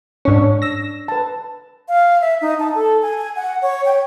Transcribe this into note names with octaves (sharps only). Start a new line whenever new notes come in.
G#2 C#4 D4 C#5
E6 A#6
B4 A5
F5
E5
D#4
A5
A4
G#5
G#5
F#5
C#5
G5